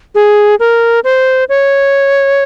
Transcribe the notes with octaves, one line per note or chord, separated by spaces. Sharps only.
G#4
A#4
C5
C#5